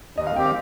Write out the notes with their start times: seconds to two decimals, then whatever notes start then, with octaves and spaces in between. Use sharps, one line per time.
0.17 D#2 D#5
0.27 F5
0.36 D#3 C4 G4 G5
0.45 F5